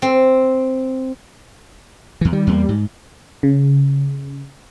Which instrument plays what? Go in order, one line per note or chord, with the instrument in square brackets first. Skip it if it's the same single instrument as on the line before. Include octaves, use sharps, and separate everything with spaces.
[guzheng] C4
[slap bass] E2 E3
[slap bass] D#3 [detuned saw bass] G3
[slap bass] E2 A3 A#3
G#2
[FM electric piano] C#3